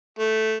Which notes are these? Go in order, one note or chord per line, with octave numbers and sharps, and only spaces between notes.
A3